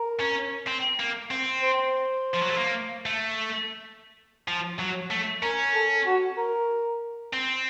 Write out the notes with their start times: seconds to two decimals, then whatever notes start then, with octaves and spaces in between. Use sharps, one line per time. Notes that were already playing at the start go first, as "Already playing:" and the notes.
Already playing: A#4
0.20 C#4
0.67 C4
1.00 A#3
1.31 C4
1.63 C5
2.34 F3
2.42 F#3
2.50 A3
2.57 A#3
3.06 A3
4.48 F3
4.79 F#3
5.11 A3
5.43 C#4 A#4
5.74 A4
6.06 F#4
6.38 A#4
7.33 C4